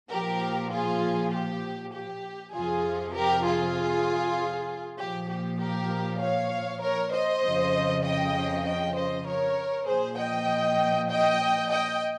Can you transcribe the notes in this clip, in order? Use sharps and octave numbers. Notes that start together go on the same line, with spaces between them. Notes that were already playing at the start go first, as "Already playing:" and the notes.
A#2 F3 G4 A#4
F4 G#4
G4
G4
F2 C3 F3 F4 G#4
G4 A#4
F4 G#4
A#2 F3 G4
G4
G4 A#4
C#5 F5
A#4 C#5
C5 D#5
F2 C#3 F3
D#5 G5
D#5 G5
C5 D#5
A#4 C#5
A#2 F3 G#4 C5
D#5 G5
D#5 G5
D#5 G5